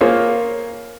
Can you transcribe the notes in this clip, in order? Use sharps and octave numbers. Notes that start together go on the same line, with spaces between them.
A#3 F4 G#4 C5 C#5